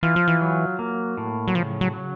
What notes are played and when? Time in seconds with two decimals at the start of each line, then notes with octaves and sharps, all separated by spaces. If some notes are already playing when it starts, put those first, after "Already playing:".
0.03 E3 F4
0.16 F3
0.28 E3
0.41 F#3
0.79 A#3
1.17 A2
1.48 F#3
1.55 C#3 F3
1.81 F#3
1.93 F#3